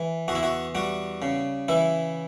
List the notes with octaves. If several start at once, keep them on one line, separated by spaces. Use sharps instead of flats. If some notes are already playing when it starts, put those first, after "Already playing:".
Already playing: E3
E2 F#4
E4
F#4
G3 F#4
C#3
E3 E4